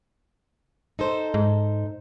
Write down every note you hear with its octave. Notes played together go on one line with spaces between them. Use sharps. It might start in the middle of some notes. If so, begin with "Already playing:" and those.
D#4 A4 C5
G#2